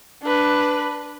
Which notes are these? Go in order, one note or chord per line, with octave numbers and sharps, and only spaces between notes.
D4 B4